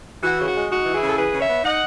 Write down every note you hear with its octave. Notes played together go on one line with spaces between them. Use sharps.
E3 F#4
C#3
F#4
G#3
D#4 F#4
E3
E4 G#4
C#3
A4
E3 G#4 B4
C#3
C#5 E5
B3
D#4 D#5 F#5